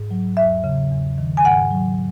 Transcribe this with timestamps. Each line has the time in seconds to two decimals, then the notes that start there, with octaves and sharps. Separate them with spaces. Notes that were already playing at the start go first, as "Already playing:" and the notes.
Already playing: G#2
0.11 F#3
0.37 E2 E5
0.64 C#3
0.92 E2
1.18 D#3
1.37 G#5
1.44 G#2 F#5
1.71 F#3